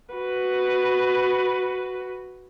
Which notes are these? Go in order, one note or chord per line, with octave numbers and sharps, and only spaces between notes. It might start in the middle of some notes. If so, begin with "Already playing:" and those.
F#4 B4